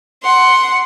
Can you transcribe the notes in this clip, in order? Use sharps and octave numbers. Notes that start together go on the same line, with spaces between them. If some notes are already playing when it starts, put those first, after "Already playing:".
F#5 C6